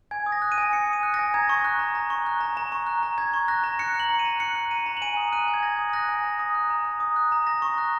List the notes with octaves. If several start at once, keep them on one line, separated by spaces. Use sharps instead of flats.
G#5 G#6
D#6
A#6
F#6
D#7
G#5
G#5 C#7
D#6
D#7
F#6
G#5 A#6
A#5 G#6
C#6
F#6
A#5
A#5
C#6
F#6
A#5
A#5
C#6
F#6
A#5
A#5 G#6
C#6
F#6 A#6
A#5
F#6 C#7
F#6
F#7
A#5
D#7
A#5
F#6 C#7
F#6
A#5 D#7
A#5
F#7
G#5 D#7
D#6
F#6 D#7
G#5
G#6
G#5 A#6
D#6
F#6 A#6
G#5
A#5
D#6
F#6
A#5
A#5
D#6
F#6
A#5
A#5 A#6
C#6
F#6